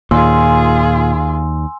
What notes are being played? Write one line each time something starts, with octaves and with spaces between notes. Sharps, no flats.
D#2 A#2 F4 G#4 G#5 C6 E6